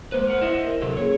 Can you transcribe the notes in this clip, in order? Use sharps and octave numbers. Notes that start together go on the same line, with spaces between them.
G#3 A#3 B4 C5
A#4 F#5
E4 C5 D#5 E5
A#4
C3 F#3 A4
A#3 C#4 G#4 C#5